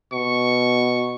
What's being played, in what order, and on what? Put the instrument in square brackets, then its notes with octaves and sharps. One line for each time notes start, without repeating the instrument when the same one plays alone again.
[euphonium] B2 [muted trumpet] C#6